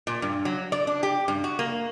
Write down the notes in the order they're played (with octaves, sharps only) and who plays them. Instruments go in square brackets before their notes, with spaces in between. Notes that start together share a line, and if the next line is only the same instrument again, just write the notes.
[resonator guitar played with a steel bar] A#2
G2
F#3
D5
D4
G4
G2
F#4
A#3